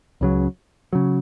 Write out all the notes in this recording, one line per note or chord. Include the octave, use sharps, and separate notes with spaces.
C#2 C#3 F#3
C#3 F#3